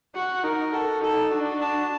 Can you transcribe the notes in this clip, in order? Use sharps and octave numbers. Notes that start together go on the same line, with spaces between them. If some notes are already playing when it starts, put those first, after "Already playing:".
F#4 F#5
D#4 A#4
F#4 A4
D#4 A4
D4 F#4
A5